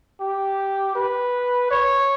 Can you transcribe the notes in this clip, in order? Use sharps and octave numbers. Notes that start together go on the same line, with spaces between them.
G4
B4
C#5